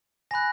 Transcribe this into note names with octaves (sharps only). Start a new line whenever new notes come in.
G#5 B5 F#6 A#6